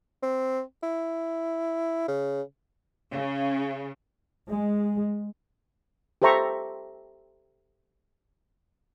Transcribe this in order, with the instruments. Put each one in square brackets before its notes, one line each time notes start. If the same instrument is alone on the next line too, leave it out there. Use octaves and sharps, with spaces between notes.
[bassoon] C4
E4
C#3
[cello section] C#3
[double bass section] G#3
[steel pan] G4 A4 C5 E5 A#5 C#6